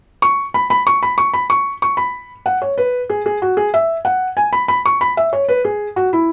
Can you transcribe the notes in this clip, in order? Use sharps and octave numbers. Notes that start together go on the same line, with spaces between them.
C#6
B5
B5
C#6
B5
C#6
B5
C#6
C#6
B5
F#5
C#5
B4
G#4
G#4
F#4
G#4
E5
F#5
G#5
B5
B5
C#6
B5
E5
C#5
B4
G#4
F#4
E4